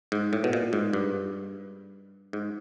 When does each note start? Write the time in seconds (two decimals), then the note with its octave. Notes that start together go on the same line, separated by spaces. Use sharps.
0.12 G#2
0.33 A2
0.44 B2
0.53 A#2
0.73 G#2
0.93 G2
2.33 G#2